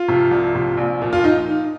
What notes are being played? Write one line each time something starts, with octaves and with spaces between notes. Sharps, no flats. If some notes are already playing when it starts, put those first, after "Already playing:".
Already playing: F4
C3 F3
C2
C3 F3
A#1
A#2 F3
F4
D#4